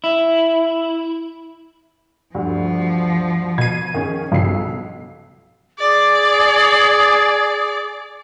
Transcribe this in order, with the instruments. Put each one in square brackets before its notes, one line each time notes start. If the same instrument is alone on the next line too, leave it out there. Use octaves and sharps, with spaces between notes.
[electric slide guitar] E4
[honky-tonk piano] D2 G2 [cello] F3
[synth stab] B2 D#7 [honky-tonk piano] G#6 C7
[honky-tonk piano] D#3 C#4 G#4
[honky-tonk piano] B1 C7 [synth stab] G2 C#3 F3
[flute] G#4 [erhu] D5